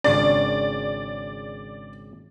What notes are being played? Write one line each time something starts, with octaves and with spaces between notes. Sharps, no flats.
G#1 C#3 D4 D5